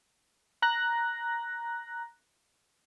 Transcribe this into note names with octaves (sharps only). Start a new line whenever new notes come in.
A#5 F#6 A#6